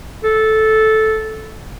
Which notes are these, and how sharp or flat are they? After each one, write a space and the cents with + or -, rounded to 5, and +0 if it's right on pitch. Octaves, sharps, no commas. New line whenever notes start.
A4 -10